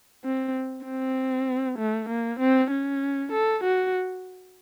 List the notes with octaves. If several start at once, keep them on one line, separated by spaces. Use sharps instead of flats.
C4
C4
A3
A#3
C4
C#4
A4
F#4